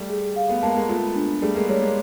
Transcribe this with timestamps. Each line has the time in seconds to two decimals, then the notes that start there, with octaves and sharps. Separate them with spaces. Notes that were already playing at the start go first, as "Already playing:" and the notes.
Already playing: G3 A3
0.10 G#4
0.36 F5
0.49 A3 B3
0.63 G#3 A#3 A5
0.76 G#3 A#3
0.89 A3 B3 F4
1.16 D4
1.42 G3 A3 G#4
1.55 G#3 A#3
1.69 G3 A3 C#5
1.82 G#3 A#3